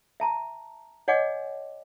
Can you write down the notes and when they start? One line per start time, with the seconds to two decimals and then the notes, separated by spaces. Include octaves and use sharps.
0.20 E5 A5 A#5
1.08 C#5 D#5 F#5 G#5 D6